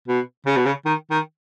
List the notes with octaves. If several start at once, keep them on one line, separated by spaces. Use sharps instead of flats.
B2
C#3
B2
C#3
D#3
D#3